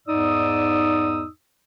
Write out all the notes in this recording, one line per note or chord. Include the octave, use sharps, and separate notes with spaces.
E2 G#2 D#4 D5 D#6 E6